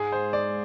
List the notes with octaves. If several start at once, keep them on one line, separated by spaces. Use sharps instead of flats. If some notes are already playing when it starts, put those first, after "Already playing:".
Already playing: G#2 G#4
C5
D5